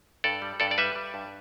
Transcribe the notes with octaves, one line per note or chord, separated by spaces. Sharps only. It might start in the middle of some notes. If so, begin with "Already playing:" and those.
G2 A4 D5
G3
G2 A4 D5
D5
G3 B4 E5
G3
G2